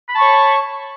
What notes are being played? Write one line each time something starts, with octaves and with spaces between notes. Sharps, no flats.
C#5 A5 B5 C#6